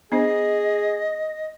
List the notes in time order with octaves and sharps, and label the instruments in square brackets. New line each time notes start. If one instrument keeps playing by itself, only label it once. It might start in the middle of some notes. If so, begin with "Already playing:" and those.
[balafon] B3 D4 C5 [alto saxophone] G#4 [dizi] D#5